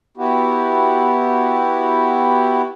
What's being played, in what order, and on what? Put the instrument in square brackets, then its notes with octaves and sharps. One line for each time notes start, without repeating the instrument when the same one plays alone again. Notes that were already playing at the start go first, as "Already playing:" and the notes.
[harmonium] B3 E4 F#4 G4